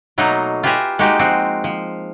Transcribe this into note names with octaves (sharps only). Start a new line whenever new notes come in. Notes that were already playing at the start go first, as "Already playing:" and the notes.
B2 F#3 A3 A#3 D#4 A#5
F4 G4 B4 E5 G#5 A#5
G#3 A#3 D#4 F#4 G4
F3 G#3 C4 F#4
F3